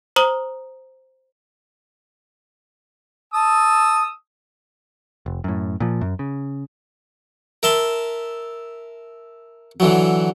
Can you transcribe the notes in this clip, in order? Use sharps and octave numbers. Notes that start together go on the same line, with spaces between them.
C5 A#5 D#6 F#7
A5 D#6 E6
F1
F#2 A2
A#2 F3
F#2
C#3
A#4 E5 A5 C6
D3 E3 F#3